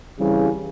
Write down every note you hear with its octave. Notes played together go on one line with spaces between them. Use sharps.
C#3 E3 G3 C4 E4 G4